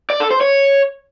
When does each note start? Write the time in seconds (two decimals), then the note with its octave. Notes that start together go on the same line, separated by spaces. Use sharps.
0.10 D5
0.20 A4
0.31 C5
0.41 C#5